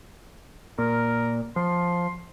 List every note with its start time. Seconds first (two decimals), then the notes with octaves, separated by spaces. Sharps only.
0.78 A#2 A#4
1.56 F3 C6